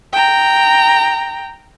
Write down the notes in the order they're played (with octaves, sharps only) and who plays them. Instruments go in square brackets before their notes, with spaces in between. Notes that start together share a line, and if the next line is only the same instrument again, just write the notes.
[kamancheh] G5 A#5